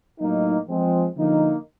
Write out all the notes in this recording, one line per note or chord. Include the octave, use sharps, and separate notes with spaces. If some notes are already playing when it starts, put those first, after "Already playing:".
A2 F#3 A#3 D#4
F3 G#3 C4
D3 F3 A#3 D#4